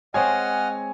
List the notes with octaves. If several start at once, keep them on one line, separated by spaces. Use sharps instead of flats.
G#3 C4 C#5 D#5 F#5 G#5 F6